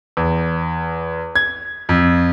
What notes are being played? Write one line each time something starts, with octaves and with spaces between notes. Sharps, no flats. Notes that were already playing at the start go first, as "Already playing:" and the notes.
E2
G#6
F2